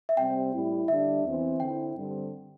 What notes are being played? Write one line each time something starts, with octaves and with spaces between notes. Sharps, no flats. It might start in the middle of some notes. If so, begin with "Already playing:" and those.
E5
C3 G3 C4 G5
A2 G3 E4
D3 G3 D4 E5
E2 E3 C4
D3 C4 E4 G5
G2 D3 G3 C4